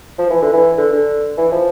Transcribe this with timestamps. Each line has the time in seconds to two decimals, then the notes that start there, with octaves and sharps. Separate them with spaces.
0.18 F3
0.30 E3
0.42 D3
0.53 E3
0.77 D3
0.92 D3
1.37 E3
1.52 F3